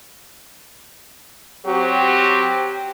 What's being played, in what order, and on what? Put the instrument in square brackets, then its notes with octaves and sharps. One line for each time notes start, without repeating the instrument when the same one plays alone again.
[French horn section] F#3 C4 G4